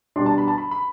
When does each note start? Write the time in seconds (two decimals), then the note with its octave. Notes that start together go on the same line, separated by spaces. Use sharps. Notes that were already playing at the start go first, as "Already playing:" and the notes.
0.16 B2 G3 D4 C6
0.26 A5
0.38 B5
0.48 A5
0.58 B5
0.71 B5